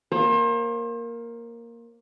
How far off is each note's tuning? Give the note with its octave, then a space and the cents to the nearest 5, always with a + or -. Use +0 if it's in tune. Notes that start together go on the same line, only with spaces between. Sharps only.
A#3 +0 C5 +35